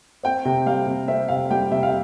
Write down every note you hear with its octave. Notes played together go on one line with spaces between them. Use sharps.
C4 G5
C3
G3 F5
C3
C4 E5
C3 F5
G3 G5
C3 E5
F5